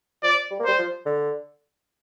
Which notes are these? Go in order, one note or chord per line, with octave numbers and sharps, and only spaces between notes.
F3 D5
G3
A#3
G3 C5
F3
D3